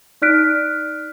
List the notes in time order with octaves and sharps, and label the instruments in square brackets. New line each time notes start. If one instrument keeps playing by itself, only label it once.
[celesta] D#4 D5 F6 F#6 B6 D7